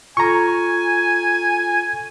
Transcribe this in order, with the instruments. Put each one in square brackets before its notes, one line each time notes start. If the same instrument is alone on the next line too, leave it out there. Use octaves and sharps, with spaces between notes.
[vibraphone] F4 A4 [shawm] G#5 [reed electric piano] A#5 C#6